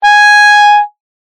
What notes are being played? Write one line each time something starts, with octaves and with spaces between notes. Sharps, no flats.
G#5